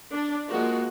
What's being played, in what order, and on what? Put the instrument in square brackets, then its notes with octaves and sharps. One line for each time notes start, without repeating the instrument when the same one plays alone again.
[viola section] D4
F3 G#3 A#3 F#4